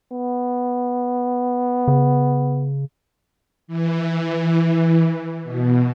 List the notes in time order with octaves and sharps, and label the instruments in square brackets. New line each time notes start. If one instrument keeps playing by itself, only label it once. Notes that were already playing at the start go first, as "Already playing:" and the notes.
[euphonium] B3
[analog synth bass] C#3
[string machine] E3
B2